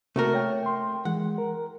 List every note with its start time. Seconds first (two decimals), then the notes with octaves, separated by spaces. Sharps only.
0.16 C3 A3 A#3 C4 F#4 A#4
0.34 C#5 G5
0.63 G5 C6
1.05 E3 G#3 F#5
1.38 A#4